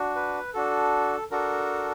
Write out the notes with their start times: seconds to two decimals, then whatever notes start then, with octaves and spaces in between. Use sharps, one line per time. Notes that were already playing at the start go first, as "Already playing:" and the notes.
Already playing: D4 F#4
0.15 B4
0.54 D4 F#4 A4
1.31 D4 F#4 A4 A#4